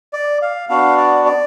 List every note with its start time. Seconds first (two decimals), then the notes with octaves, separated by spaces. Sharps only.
0.13 D5
0.42 F5
0.69 B3 D4 F#4 F5
0.97 D5
1.25 D5